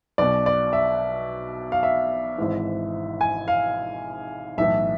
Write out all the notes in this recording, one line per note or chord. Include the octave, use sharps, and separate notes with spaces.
B1 B2 D5
D5
E5
F5
E5
G#1 G#2 E3
G#5
F5
B1 A2 E3 E5